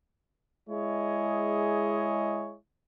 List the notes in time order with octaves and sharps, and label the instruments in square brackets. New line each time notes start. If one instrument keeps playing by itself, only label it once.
[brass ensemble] G#3 E4 G#4 C#5 D#5